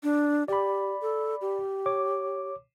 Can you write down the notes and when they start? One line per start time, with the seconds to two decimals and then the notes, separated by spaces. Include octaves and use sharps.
0.03 D4
0.48 G4 D5 B5
1.02 A4
1.41 G4
1.86 C#5 D6